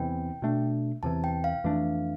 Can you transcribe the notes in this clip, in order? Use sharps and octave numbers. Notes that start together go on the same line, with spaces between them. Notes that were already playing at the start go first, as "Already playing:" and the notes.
Already playing: E2 C3 E3 G5
B2 A3 D4
E2 C3 E3 A5
G5
F5
F2 E3 A3 D4